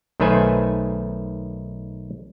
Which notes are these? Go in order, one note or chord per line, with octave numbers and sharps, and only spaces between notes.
B1 D#3 A3 B4 C5 G#5